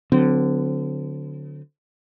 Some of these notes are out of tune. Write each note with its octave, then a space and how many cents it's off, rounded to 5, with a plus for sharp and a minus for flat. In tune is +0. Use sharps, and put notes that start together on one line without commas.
D3 +0 F#3 -25 C4 -40